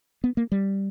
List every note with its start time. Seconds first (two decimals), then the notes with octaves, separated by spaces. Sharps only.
0.24 B3
0.37 A#3
0.52 G3